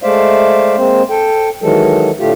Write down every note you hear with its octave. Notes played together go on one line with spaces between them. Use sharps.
G#3 A3 C5 D5 E5 F5
G#3 A#3 C4 C5
A4 G5
D#3 E3 F#3 G#3 A4
A2 D3 A3 F4 G4